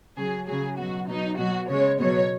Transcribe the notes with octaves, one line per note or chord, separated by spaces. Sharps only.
C#3 F#3 G#4
C#3 F#3 G#4
B2 F#3 F#4
B2 F#3 D#4
B2 F#3 F#4
C#3 G#3 C#5
B2 F#3 C#5